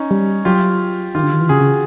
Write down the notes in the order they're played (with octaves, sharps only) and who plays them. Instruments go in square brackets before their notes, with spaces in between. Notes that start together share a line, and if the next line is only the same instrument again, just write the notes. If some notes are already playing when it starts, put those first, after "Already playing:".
Already playing: [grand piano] C#4 D#4
[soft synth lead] G3
[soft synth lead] F#3 [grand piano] F4 G4
[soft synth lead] D#3 [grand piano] F4 G4
[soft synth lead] D3
D#3
E3
[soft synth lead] C#3 [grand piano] F#4 G#4
[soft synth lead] C#3